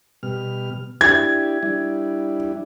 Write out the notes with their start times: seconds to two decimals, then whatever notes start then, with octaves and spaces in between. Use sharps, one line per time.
0.23 B2 G3 F6
1.01 D4 E4 G4 G#6
1.63 G3 D4 E4